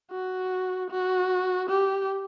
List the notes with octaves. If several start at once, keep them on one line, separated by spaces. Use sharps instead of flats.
F#4
F#4
G4